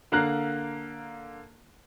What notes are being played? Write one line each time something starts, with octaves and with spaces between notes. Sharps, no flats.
D3 A#3 F5 A#5 F#6